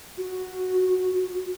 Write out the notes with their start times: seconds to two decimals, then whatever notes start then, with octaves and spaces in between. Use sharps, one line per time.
0.18 F#4